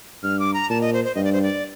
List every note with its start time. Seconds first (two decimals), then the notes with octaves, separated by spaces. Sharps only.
0.23 G2 F6
0.39 D6
0.54 A#5
0.70 A#2 A5
0.81 D#5
0.93 C5
1.04 C5
1.15 G2 D#5
1.24 D5
1.33 C5
1.43 D5